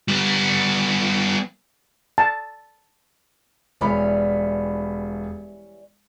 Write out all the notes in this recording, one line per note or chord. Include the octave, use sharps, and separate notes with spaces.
G3 B3
A5
E1 E3 G3 C#4 B5